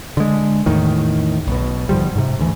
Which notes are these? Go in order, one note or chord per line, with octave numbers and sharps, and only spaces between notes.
D3 G#3
E2 A2 D#3
B1 B2
G#2 D3 F3 G3
G#2 C3
D2 E3